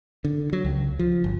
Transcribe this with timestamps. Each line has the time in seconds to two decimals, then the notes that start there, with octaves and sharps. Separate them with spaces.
0.25 D3
0.53 F#3
0.65 C#2
0.99 F3
1.24 G1